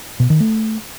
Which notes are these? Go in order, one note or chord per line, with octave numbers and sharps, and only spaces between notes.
B2
D#3
A3